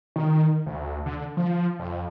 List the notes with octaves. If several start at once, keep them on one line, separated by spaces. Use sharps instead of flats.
D#3
D2
D3
F3
F2